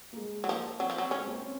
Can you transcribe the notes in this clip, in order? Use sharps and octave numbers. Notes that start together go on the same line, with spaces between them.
A#3
G#3
F#3
F3 A#3
F#3 C4
F3
F#3
C4 C#4
G#3
A#3
C4
C#4